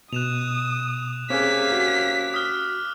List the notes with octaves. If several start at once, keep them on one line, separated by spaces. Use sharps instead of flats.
B2 D#6 F#6 E7 F7
C3 A#3 C4 C#4 G#4 D6 F#6 B6
F#4
D#6 F6